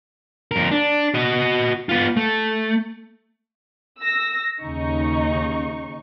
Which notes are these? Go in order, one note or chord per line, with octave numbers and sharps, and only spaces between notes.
F2 A#4
D4
F#4 D#5
B3 F4
A3
E6 A#6
D#2 C#3 D#4 C#6